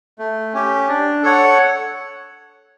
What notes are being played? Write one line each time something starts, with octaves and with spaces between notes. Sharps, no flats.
A3
C#4 G4
D4
A4 C#5 F#5